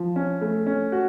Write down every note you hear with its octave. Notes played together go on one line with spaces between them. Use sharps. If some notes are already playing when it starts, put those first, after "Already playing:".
Already playing: F3
C#4
A3
C#4
F#4